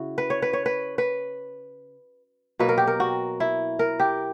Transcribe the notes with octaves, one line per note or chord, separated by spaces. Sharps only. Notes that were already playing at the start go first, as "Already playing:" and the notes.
Already playing: C#3 E4 F#4
B4
C#5
B4
C#5
B4
B4
B2 F#3 A#3 B4
A#4
G4
A#4
F#4
E4
A#4
G4